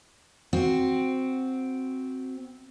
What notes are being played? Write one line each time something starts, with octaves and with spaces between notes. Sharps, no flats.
C4 F#4